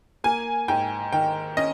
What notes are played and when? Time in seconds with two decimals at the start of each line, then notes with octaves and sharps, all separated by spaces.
0.24 A#3 G#5
0.68 G#2 G5
1.13 D#3 G5
1.57 C#4 D#5